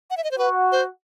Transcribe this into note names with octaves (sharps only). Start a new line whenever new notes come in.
F#5
E5
D#5
C5
F#4 B4
C5